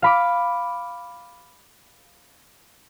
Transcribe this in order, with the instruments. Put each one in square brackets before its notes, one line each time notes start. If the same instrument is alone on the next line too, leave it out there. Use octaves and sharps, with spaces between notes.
[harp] F5 B5 D6